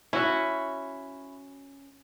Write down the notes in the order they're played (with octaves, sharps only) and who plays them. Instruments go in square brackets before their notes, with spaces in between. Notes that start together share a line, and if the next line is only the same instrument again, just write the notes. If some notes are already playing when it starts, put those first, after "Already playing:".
[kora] C#4 F#4 [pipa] E4